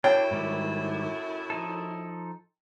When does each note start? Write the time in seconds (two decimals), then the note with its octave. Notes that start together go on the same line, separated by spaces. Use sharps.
0.04 F#2 A2 D4 E4 C#5 G5
0.31 G#2 D#3 G3
1.50 F3 D#4 A4